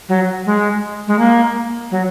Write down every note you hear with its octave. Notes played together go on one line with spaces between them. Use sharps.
F#3
G#3
G#3
A#3
F#3